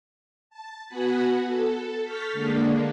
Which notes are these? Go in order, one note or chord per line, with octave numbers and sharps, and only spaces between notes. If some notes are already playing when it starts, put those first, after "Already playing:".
A5
B3 F#4 F#5 G#5 B5
A4
C#6 F6 G6 A6 B6
D3 G#3 A#3 D4